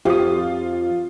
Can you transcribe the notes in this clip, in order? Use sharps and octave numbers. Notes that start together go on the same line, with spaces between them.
F2 F4 G4 D#6